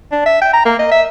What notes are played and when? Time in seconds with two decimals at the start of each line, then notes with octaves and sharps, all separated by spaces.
0.12 D4
0.25 E5
0.41 G5
0.53 A#5
0.65 A#3
0.79 D#5
0.91 E5